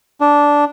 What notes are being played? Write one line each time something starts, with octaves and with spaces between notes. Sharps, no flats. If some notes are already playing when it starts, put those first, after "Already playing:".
D4